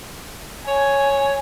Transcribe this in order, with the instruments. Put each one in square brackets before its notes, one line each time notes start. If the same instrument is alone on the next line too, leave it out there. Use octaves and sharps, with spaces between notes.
[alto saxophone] C#5 [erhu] G#5